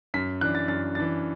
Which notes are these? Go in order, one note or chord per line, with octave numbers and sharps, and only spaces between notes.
F#2 B6
E3 D4 F#6
A6
F#2 A6
E3 D4 A6